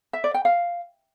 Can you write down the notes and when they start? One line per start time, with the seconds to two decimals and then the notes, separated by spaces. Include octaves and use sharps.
0.13 E5
0.24 D5
0.34 G5
0.45 F5